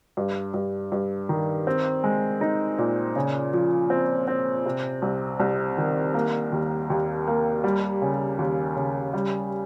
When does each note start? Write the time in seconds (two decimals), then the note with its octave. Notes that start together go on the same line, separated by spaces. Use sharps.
0.17 G2
0.54 G2
0.92 G2
1.29 D#3
1.67 C4
2.04 G#3
2.41 D#4
2.78 A#2
3.16 C#3
3.53 F3
3.90 C4
4.28 C4
4.66 C3
5.02 C2
5.40 C2
5.78 D#3
6.14 A#3
6.52 D#2
6.90 D#2
7.27 A#3
7.64 G3
8.02 C#3
8.39 D#2
8.76 C#3
9.14 G3